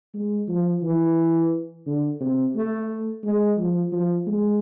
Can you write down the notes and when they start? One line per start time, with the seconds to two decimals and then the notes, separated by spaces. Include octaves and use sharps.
0.14 G#3
0.49 F3
0.83 E3
1.86 D3
2.20 C3
2.56 A3
3.24 G#3
3.58 F3
3.92 F3
4.27 G#3